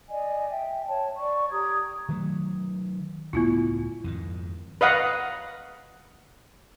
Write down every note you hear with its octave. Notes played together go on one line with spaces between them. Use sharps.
D5 D#5 G#5
E5 G5
C#5 A5
D5 C#6
G4 A#5 D#6 G#6
D#3 F#3 A3
C#2 A2 B3 E4 F4
F2 G#2 D#3
B4 D#5 F5 F#5